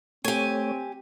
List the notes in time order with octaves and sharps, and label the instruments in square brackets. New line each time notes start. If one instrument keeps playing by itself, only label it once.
[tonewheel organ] A3 C#5 [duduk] C4 [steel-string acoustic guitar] G4 G#5